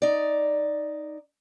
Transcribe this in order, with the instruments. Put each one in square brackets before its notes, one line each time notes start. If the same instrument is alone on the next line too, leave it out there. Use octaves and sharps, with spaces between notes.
[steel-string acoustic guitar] D#4 D5